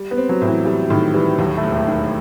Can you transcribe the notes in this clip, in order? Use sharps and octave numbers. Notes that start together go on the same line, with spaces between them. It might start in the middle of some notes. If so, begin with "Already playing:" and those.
Already playing: G3
B3
C4
F#3
A2
E3
E3 G3
A2 D#3
E3 G3
D#2 F#3
A3
E1
A3
D#3